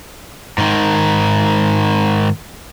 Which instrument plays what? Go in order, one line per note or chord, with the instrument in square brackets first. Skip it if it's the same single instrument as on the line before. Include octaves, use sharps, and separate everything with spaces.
[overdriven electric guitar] G#2 D#3